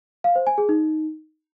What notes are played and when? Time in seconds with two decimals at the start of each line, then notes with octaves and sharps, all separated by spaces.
0.24 F5
0.35 C5
0.47 G#5
0.58 G#4
0.69 D#4